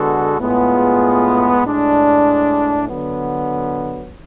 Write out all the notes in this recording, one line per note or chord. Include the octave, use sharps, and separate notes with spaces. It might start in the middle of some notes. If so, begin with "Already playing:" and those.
Already playing: D3 G#3 B3 F#4 A4
A2 G#3 B3 F4 G#4
A2 G#3 D4
D3 F#3 B3